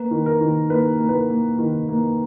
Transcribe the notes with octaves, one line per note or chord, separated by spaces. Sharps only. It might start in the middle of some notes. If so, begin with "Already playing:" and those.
Already playing: A#3 B4
D#3
A#4
D#3
A#3 B4
A#3
B4
A#4
A#3
D#3
A#3